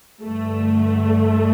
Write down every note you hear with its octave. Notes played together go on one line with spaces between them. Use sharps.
G2 D3 A3